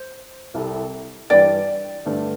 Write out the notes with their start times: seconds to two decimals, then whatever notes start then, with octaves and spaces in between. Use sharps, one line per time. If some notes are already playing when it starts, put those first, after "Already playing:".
Already playing: C5
0.54 C2 C3 G3 E4 A4
1.30 G2 E3 G3 D5 G5
2.05 G2 D3 A3